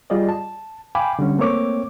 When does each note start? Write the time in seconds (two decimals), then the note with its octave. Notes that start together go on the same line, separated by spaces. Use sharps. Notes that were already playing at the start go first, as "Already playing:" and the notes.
0.10 G3 F4 G#4 D5 D#5
0.29 A5
0.95 F5 G5 G#5 B5 D6
1.19 D3 G3 C#4
1.39 A3 A#3 C4 C#5 D6